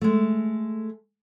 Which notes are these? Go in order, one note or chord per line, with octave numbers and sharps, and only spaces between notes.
G#3 A3